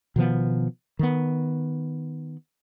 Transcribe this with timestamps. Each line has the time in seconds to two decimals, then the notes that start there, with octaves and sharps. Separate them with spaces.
0.16 B2 D#3 F3 B3
0.99 D#3 B3